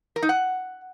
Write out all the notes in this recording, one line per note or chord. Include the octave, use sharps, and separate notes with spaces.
A#4
D#4
F#5